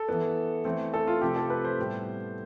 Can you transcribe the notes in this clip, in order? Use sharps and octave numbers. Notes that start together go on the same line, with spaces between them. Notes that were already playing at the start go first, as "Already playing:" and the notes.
Already playing: A4
E3 B3
E3 A3 C4
A4
F4
C3 F3 A3 C4 G4
A4
B4
C5
A2 G3 B3